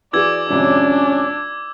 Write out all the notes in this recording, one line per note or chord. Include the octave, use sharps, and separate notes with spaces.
E3 F#4 G#4 D5 D6 E6 G#6
G#1 F2 C3 C#4 D4